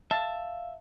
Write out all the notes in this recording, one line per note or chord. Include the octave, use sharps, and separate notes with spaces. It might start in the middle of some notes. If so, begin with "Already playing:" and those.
E5 F5 A5